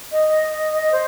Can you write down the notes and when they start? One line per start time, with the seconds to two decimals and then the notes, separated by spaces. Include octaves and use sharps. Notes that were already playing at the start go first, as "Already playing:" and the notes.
0.11 D#5
0.92 C5